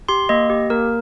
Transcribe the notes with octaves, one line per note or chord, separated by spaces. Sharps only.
G4 C6
A#3 D#5
G4
A#3 A#4